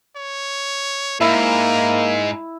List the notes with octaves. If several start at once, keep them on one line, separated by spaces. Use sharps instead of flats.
C#5
G#2 A#3 E4 A#4